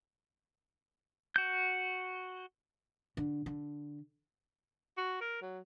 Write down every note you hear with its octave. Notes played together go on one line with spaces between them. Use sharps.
F#4 G6
D3
D3
F#4
A#4
F#3